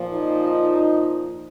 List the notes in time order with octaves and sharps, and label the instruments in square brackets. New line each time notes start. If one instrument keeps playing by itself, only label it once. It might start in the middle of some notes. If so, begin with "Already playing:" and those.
Already playing: [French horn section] A#2 F3
D#4